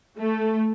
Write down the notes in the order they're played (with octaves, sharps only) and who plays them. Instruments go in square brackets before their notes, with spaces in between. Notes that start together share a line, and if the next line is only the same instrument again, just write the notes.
[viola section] A3